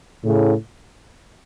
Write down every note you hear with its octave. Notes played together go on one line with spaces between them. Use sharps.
A2 C#3